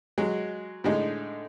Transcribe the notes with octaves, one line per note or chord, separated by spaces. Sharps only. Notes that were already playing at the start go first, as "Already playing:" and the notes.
F#3 G#3
A2 D3 G#3 D#4